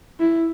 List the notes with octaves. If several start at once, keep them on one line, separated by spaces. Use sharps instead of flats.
E4